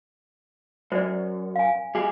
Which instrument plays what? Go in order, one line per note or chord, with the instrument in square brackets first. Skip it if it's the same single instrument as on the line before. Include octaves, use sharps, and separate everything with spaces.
[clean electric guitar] F#2 [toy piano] C5 D5
[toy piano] F5 G#5
[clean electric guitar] G3 G#4